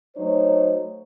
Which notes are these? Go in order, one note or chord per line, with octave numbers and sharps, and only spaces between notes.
F#3 A3 D#4 C5 C#5